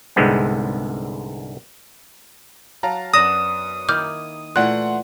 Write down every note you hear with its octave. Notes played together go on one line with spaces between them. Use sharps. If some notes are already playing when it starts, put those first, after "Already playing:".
C2 G#2 D3 G#3 B3 C4
F#3 F5 A5 A#5
F#2 B3 D4 D#6 A#6 E7
D#3 A#3 E4 D6 F6 G6
A#2 E3 A3 F#5 G5 C6 F#6